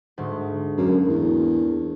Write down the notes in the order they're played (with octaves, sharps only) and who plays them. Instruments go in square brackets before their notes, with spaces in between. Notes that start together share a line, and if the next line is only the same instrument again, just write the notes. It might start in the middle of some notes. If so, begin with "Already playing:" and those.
[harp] D2 G#2
[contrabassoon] F#2 [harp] A#3
[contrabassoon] E2